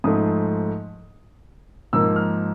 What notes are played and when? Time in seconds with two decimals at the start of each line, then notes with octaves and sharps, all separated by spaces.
0.04 G#2 F3 A3 D#6
1.93 G#2 F3 A#3 E6
2.16 F6